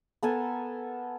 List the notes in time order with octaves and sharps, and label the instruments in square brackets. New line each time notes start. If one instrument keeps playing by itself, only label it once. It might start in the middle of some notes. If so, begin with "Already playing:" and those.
[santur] B3 A4 A#4 G#5